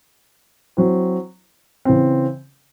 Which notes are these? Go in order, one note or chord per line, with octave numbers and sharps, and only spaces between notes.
F#3 C4 E4 C5
C#3 E3 C4